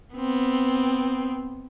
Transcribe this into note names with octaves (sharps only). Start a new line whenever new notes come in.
B3 C4